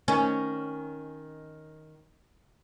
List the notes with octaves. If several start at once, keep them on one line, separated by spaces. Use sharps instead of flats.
D#3 C#4